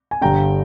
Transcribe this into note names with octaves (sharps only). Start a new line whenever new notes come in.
G#5
G1 G2 D3 G5 A#5